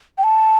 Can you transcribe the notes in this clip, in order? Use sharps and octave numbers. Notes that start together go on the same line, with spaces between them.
G5
A5